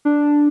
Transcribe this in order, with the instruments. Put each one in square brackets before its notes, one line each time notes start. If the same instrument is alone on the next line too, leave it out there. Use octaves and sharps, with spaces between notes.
[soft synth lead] D4